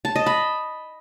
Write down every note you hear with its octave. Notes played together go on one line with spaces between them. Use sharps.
A5
D#5
B5